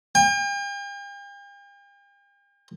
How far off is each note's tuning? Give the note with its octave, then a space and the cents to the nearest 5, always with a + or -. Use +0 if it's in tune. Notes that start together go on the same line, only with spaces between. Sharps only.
G5 +45